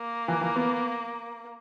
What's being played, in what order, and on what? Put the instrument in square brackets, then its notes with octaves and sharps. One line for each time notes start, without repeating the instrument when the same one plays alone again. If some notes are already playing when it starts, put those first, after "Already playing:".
Already playing: [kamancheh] A#3
[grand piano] E3
E3
B3